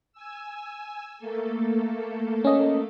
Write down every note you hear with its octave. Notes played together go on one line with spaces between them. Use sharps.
G#5 E6
A3 A#3 A4
C#4 D#5